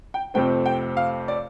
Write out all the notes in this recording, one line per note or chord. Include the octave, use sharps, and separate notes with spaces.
G5
F2 C3 A3 C4 G5
G5
F5
D5